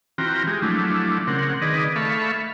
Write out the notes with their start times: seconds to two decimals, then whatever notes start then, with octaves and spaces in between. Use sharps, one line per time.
0.18 E3 C4 F4 F#4 G5 A#5
0.47 G#3 G4
0.62 F3 F#3 A3 D4 E4
1.27 C#3 C4 A#4 F#5
1.62 D#3 G#4 B4 D5 D#5
1.96 A3 A4 E5 F5 B5 C#6